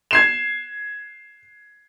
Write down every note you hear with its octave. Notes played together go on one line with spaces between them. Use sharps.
G#6 C7 E7